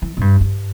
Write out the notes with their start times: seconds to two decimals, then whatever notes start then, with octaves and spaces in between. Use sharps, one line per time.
0.02 E3
0.17 A2
0.21 G2
0.41 G2